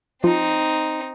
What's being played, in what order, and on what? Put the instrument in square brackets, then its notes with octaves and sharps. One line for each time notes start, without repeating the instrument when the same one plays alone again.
[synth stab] F3 [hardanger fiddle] C4 D#4